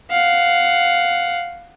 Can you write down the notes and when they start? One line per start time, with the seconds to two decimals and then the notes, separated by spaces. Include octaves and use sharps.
0.11 F5 F#5